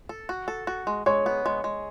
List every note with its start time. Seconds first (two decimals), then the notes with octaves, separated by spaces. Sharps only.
0.09 A4
0.29 F#4
0.48 A4
0.67 F#4
0.87 G#3
1.06 G#3 C#5
1.26 B3
1.46 G#3
1.64 G#3